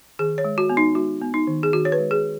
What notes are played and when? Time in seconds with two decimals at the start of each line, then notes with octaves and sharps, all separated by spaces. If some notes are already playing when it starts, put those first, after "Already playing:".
0.19 D#3 G#4
0.38 C#5
0.44 G#3
0.58 F#4
0.70 B3
0.77 D#4
0.95 G#3 F#4
1.21 B3
1.34 D#4
1.47 D#3
1.63 G#4
1.73 D#3 F#4
1.85 C#5
1.92 B4
1.98 G#3
2.11 G#4